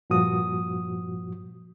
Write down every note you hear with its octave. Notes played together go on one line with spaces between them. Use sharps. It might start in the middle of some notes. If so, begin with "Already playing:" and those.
G2 A#2 F3 F#4 D#6